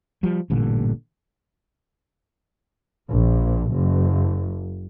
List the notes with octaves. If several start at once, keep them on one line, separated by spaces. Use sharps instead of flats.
F3 G3
A1 G2 A#2 D3
A#1
F#1